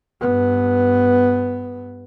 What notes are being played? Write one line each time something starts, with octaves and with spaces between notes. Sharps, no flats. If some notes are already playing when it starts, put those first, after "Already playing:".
G2 B3